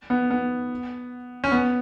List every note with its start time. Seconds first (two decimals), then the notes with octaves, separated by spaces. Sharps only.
0.10 B3
0.31 B3
1.44 C#4
1.52 B3